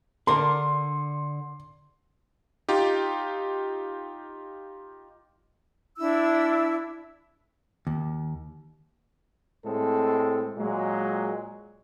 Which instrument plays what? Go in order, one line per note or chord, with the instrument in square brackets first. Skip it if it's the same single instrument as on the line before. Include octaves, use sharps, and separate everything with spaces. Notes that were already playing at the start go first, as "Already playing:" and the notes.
[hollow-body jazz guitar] D3 D4 A#4 [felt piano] C6
[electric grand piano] D#4 F4 G4
[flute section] D4 E4 E6
[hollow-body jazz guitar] D#2
[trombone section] A2 G#3 C4 A4
A#2 F#3 G#3